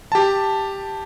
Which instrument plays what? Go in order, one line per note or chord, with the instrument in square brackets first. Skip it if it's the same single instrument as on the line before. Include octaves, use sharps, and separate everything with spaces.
[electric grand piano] G4 A5